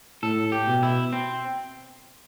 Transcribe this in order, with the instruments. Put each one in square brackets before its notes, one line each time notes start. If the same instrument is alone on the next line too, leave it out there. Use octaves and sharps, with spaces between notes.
[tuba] A2 [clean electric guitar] A4
[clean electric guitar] G4
[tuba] B2
[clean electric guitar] E4
C4